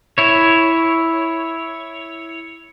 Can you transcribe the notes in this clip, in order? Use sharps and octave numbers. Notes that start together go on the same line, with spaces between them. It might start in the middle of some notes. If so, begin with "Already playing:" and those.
E4 C#5